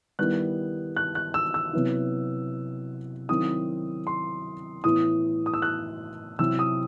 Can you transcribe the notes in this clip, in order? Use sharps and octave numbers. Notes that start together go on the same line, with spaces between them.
D#3 G3 B3 E4 F#6
F#6
F#6
E6
E6
C3 F#3 B3 E4
D#3 F#3 C4 E4 D#6
C6
A2 E3 B3 E4 D#6
D#6
E6
F#6
C3 F#3 C4 E4 E6
D#6